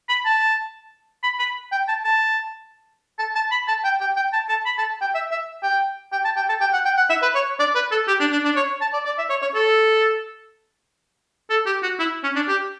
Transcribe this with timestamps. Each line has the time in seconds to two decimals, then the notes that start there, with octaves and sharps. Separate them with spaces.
0.09 B5
0.25 A5
1.23 B5
1.39 B5
1.72 G5
1.88 A5
2.04 A5
3.19 A5
3.35 A5
3.52 B5
3.68 A5
3.84 G5
4.01 G5
4.17 G5
4.33 A5
4.49 A5
4.66 B5
4.78 A5
5.01 G5
5.15 E5
5.31 E5
5.63 G5
6.12 G5
6.25 A5
6.37 G5
6.49 A5
6.61 G5
6.73 F#5
6.85 G5
6.97 F#5
7.10 E5
7.22 B4
7.35 C#5
7.59 D5
7.75 B4
7.91 A4
8.08 G4
8.20 D4
8.32 D4
8.45 D4
8.56 C#5
8.81 A5
8.93 D5
9.06 D5
9.18 E5
9.30 C#5
9.42 C#5
9.55 A4
11.50 A4
11.66 G4
11.83 F#4
11.99 E4
12.23 C#4
12.36 D4
12.48 G4